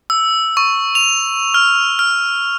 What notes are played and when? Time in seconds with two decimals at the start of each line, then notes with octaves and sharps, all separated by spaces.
0.10 E6
0.57 C#6
0.95 F7
1.54 F6
1.99 F6